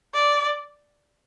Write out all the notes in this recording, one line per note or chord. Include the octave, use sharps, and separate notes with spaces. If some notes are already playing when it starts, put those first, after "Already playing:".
D5